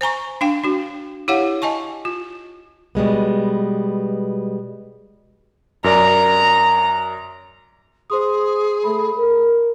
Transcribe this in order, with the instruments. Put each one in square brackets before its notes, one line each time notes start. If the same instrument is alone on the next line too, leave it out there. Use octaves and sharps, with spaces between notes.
[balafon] C5 G#5 A#5 C#6
D4 F5 G5
D4 F#4
E4 G4 C#5 F5 F#5
D#5 G#5 A5 C#6
F4
[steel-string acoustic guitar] B2 G3 G#3 B3
[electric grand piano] F#2 A#4 D5 [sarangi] A#5
[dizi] G#4 [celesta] C5 C6 D#6
[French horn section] A3 [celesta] B5
[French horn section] A#4